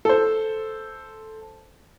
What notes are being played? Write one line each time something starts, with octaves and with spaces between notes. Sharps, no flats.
A4 C5